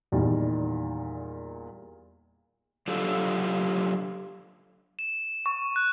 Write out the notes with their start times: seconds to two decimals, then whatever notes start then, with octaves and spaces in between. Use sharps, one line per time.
0.12 E2 A#2 D#3 G3
2.88 F#3 D4 F4 G4 A4
4.99 E7
5.46 C#6
5.76 F#6